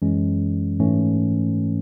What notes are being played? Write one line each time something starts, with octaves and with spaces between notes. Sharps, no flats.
F#2 E3 G#3 C#4
G#2 E3 A3 C#4